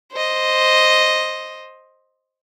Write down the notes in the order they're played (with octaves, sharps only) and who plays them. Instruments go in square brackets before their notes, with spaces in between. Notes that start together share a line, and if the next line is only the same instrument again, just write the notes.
[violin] C5 D#5